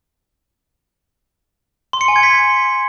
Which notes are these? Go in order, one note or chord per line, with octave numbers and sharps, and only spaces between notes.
C6
C#7
G#5
G#6
B6